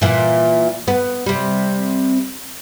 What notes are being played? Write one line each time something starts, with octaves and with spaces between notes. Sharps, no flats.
A#2 E3
B3
C3 G3